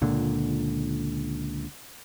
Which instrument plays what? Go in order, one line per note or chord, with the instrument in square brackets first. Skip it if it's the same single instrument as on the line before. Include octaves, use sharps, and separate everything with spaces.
[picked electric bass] C#2 A#2 D3